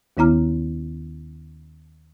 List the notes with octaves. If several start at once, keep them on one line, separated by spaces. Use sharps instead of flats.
D#2 D#3 B3 E4 A#5 F6